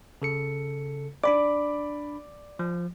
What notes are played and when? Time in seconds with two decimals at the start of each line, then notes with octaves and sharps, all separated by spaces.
0.22 C#3 A4 C#7
1.24 D4 D5 B5 D6
2.59 F3